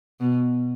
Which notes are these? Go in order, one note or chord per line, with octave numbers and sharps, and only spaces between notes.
B2